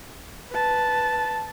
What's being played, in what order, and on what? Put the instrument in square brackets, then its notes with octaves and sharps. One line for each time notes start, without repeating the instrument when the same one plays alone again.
[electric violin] B4 A5